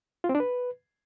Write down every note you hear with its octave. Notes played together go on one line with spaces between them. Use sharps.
F4
C4
D4
B4